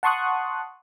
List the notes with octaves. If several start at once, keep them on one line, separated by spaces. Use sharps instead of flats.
F#5 A5 C6 C#6 D#6 F#6